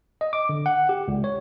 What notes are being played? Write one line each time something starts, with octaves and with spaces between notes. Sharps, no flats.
D#5
D6
D3
F#5
G4
C#2
C#5